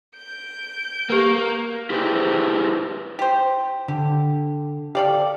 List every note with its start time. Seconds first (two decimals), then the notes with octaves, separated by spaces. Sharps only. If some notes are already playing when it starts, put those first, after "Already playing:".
0.16 G6 D7
1.10 A#3 G4 A#4
1.90 E4 G4 G#4 B4 C5
3.19 G4 C5
3.88 D3 G4
4.95 G4 A4 D5 F5